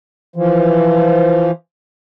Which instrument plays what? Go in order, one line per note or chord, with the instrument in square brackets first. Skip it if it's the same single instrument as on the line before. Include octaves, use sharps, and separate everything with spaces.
[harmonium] E3 F3